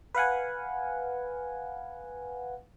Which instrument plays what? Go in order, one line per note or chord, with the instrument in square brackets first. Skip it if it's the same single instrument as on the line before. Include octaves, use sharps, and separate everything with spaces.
[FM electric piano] B4 F5 F#5 G#5